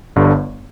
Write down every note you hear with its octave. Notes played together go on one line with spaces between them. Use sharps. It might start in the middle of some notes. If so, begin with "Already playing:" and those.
G1 G2 D3